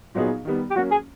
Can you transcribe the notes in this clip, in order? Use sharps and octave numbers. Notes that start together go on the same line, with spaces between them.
A#2 F#3 B3 D#4 G#4
D#3 G3 B3
G4
F#3 A#3 C#4 F#4
G#4